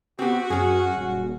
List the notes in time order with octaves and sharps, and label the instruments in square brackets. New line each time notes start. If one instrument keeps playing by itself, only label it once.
[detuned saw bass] B3 [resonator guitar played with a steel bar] C4 G4 [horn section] F#4
[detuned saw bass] F#2 [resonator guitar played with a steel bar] C#4 G#4
[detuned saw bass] D#1